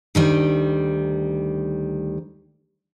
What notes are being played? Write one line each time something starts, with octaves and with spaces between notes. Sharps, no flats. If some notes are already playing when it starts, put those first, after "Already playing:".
D2 D#3 G3